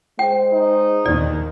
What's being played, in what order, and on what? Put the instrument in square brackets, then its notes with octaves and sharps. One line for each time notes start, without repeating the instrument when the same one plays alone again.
[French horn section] G#3 C5 [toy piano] G5
[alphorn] D#4
[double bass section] D#2 D#3 [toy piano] D5